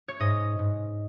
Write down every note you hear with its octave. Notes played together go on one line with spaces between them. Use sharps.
C#5
G#2 D#5
G#2